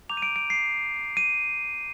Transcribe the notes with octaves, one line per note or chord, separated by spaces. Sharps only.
A#5 D6 G6 F7
D#7
D7
D7
C7
D#7